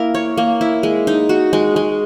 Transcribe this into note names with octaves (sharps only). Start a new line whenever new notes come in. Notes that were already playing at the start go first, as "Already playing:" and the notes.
Already playing: A#3 E4 A#4
C#5
A#3
E4
G#3
D#4
F#4
G#3
G#3